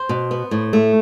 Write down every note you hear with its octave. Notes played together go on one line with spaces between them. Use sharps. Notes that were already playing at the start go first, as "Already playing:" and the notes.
Already playing: C5
B2
B3
A2
A3